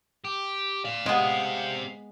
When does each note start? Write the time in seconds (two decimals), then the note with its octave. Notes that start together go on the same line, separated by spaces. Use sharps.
0.24 G4
0.85 D5 F5
1.06 G#3 B3 C4 G4